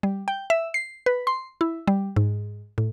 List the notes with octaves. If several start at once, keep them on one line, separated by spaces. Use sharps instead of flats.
G3
G5
E5
C7
B4
C6
E4
G3
G#2
A2